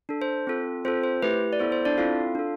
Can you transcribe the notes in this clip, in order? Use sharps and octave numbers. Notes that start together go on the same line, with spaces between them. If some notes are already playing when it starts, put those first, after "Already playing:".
D4 A4
C5
C4 F4 A4
C4 F4 A4 C5
C5
A3 E4 G4 B4
D5
B3 E4 A4 C5
C5
D4 D5
C4 E4 F4 A4 F5
D4 A4